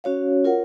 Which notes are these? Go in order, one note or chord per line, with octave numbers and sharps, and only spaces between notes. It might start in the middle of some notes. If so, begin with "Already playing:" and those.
C#4 F#4 C#5 F5
F4 A#4 C#5 F#5